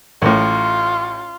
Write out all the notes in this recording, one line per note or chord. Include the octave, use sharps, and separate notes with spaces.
A1 A2 F4